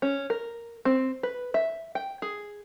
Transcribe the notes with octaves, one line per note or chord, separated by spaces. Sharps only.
C#4
A#4
C4
B4
E5
G5
G#4